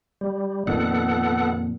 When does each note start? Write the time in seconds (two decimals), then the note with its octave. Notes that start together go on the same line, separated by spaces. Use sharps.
0.21 G3
0.67 F2 A#2 D#3 B3 A4 F#5